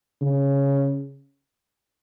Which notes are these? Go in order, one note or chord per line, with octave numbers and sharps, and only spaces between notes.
C#3